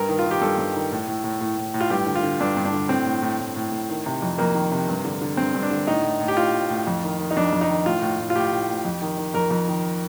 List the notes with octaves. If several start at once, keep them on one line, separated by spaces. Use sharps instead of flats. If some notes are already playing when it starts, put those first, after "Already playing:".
Already playing: G2 A#4
D#3
F4
D#3
G4
G2 A4
G2
D#3
A2
A2
A2
A2
A2
A2
F4
G2 G4
D3
F4
D3
G2 D4
G2
D4
D3
A2 C4
A2
A2
A2
A2
A2
D#3
C3
F2
F2 A#3
D#3
C3
G2
D3
D3
G2 C4
G2
D4
D3
A2 D#4
A2
A2
G4
A2 F4
A2
A2
F2
D#3
D#3
D#4
F2 D4
F2
D#4
D#3
A2 F4
A2
A2
F4
A2 G4
A2
A2
F2
D#3
D#3
F2 A#4
F2
D#3